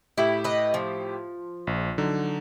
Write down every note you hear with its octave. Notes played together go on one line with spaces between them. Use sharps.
A2 E4 G4 E5
B4 D#5
F3
A#1
D3 F#3 D#4